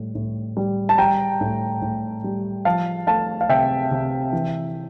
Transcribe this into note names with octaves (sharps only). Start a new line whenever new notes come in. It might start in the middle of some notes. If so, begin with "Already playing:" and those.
Already playing: A2 G3
A2
G3
A5
G3 G5 A#5
A2
A2
G3
F3 F5 A5
A3 F5 A5
F5
C3 E5 G5
C3
E3